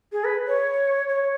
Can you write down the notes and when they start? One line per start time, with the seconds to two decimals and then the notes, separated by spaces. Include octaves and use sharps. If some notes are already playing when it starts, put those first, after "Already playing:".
0.12 G#4
0.24 B4
0.47 C#5
1.09 C#5